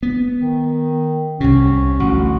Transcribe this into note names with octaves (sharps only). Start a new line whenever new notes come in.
B3
D#3
C2 C3 C#4
A1 D2 F#4